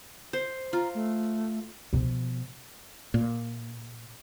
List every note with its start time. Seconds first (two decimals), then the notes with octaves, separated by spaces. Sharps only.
0.33 C5
0.73 F4 A#5
0.95 A3
1.93 B2 F3
3.14 A#2